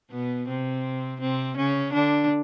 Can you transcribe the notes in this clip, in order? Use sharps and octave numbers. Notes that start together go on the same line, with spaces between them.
B2 B3
C3 C4
C3 C4
C#3 C#4
D3 D4